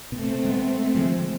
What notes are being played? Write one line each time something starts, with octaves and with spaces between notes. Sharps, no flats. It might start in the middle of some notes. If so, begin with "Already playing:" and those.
B2 A3 C4
G#3 B3
D3 F3 G#3